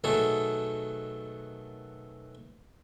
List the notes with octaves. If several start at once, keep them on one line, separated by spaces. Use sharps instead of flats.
B2 D#3 F#3 A3 G#4 A4